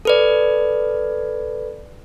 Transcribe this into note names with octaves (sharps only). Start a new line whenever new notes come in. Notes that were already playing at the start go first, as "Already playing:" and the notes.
A4 B4 D5